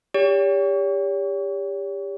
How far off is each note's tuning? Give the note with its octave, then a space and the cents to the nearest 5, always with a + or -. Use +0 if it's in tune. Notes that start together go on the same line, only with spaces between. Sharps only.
G4 +30 C#5 +40